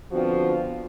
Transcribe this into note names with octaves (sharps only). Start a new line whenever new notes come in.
D3 F3 B3 C4 F4 F#4